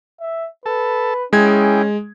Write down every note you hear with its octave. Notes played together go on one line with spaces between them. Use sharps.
E5
A4 B4 A5
G#3 C#4 E4 G#4 G5 G#6